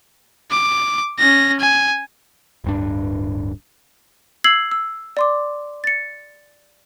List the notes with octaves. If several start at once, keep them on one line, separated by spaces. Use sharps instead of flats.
D6
C#4 A#6
G#5
D1 G2 D4
E6 G#6 C7 F#7
E6
D5 C6 D6
A6 C#7